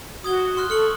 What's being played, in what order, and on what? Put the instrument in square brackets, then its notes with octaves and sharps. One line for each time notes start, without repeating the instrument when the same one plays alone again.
[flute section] F#4 [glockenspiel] D#6 G#6 G7
[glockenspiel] C6 F6 F#6
[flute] A4 [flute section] C#6 [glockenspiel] F6 C#7 F#7